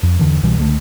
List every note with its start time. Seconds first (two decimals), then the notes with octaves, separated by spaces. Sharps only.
0.03 F2
0.19 E2 D3 E3
0.43 C2 B2 E3 G3
0.58 C#2 D3 G#3 A3